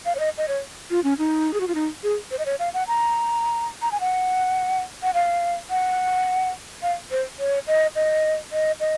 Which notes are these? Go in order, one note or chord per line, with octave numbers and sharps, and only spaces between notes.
F5
C#5
D#5
D#5
C#5
F4
C#4
D#4
G#4
F#4
F4
D#4
G#4
C5
D#5
C#5
F5
F#5
A#5
A#5
G#5
F#5
F#5
F5
F#5
F5
C5
C#5
D#5
D#5
D#5
D#5